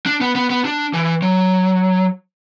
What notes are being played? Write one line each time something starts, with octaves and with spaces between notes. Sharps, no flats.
D4
B3
B3
B3
D4
E3
F#3